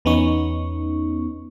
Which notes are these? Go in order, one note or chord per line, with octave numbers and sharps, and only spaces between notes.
E2 B3 C#4 D#4 C#6